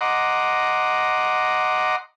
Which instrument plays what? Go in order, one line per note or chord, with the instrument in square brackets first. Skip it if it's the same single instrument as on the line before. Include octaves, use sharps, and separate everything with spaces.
[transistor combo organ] D#5 F#5 A#5 C6 D6